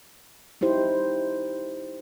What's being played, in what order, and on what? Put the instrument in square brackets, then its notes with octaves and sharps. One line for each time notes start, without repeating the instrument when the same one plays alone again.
[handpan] D#4 E4 G4 C5